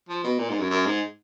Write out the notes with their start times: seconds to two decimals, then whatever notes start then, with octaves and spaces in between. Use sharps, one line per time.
0.09 F3
0.24 B2
0.39 A#2
0.49 G#2
0.59 F#2
0.70 F#2
0.86 G#2